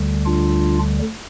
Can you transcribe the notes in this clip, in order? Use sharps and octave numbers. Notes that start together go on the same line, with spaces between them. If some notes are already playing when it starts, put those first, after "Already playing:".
Already playing: D2 D3 G3
D4 F4